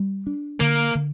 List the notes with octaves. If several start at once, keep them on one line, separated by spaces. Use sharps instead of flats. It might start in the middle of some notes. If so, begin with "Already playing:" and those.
Already playing: G3
D4
D3 A#3
D3